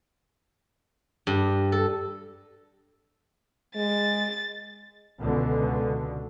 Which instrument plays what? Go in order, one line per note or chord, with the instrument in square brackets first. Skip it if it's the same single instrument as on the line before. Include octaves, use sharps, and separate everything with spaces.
[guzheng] G2
A4
[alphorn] G#3 [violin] A6
[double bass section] C#2 B2 D3